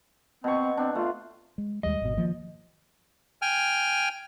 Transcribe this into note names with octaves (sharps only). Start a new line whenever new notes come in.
B2 C4 C#6
C4 D4
A3 F4
G#3
D#2 G3 G#3 D#5
G#1 B2
D#3 F3 A#3
G5 G#5 F6